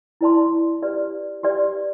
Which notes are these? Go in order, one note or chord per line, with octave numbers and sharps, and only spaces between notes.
E4 B4 D5 A5 C6
G4 B4 D5
G4 B4 D5